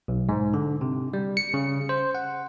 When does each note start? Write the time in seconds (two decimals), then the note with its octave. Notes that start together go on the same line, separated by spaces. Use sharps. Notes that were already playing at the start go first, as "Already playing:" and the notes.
0.08 B1
0.29 G#2
0.54 D3
0.81 C3
1.13 G3
1.37 C#7
1.54 C#3
1.89 C5
2.15 F#5